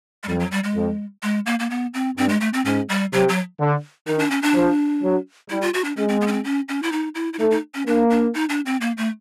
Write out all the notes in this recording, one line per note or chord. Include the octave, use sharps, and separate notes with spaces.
G#3
F2 G3
F#3
G3
G#3
F2
G#3
A#3
A#3
B3
C4
G2 C4
G#3
A3
C4
G#2 C#4
G3
C3 F#3
F#3
D3
D#3 D#4
D4
C#4
D4
F3
F#3
G3 E4
F4
F#4
D4
G#3 C#4
C4
B3
C#4
C4
C#4
C#4
E4
D#4
E4
E4
A3 D#4
D#4
C#4
A#3 D4
D4
D#4
D4
C4
A#3
A3